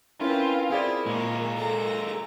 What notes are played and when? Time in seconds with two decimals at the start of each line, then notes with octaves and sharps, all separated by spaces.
0.21 C4 C#4 E4 F4 A#4 B4 G#5
0.70 C4 E4 G#4 A#4 D5
1.06 A#2 G#3 A#3 C#5
1.57 A4 A#5